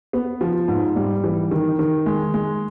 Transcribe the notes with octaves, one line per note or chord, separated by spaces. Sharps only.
B3
F3
G#2
G3
E3
D#3
D#3
G#3
G#3